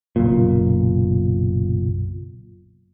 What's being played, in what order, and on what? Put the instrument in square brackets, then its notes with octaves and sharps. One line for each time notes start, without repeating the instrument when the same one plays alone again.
[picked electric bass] F#1 B1 A#2